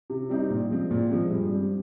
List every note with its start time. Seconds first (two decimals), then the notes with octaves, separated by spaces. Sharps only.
0.10 C3
0.29 G3 C4 D#4
0.50 A#2
0.70 F3 G#3 C4
0.91 A#2
1.10 F3 G#3 C4
1.31 G2
1.51 G3 C4